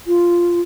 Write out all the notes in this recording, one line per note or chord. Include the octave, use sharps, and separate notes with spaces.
F4